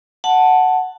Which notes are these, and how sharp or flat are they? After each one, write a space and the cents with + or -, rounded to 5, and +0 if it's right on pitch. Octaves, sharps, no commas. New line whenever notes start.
F#5 +0 A5 +0